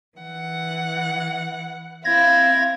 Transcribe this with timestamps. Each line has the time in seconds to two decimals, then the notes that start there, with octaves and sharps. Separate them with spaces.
0.18 E3 F#5
2.05 C4 E4 F5 G#6 A#6